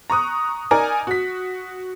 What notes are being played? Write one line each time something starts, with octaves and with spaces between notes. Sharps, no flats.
A#5 C#6 D#6 F#6
D#4 A#4 D5 G#5 A#5
F#4 B6